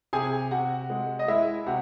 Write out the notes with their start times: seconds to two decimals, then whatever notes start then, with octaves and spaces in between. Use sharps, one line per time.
0.13 C3 G#4 G#5
0.51 C3 F#4 F#5
0.90 G#3
1.19 D#5
1.28 G#3 E4 E5
1.66 C3 F#4